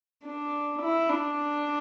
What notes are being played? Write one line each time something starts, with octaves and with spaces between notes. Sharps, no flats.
D4
E4
D4